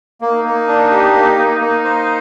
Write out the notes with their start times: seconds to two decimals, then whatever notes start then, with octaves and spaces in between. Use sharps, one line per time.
0.21 A#3 D#4
0.45 A#3
0.67 D4
0.91 G4
1.15 A#3
1.38 A#3
1.61 A#3
1.84 C5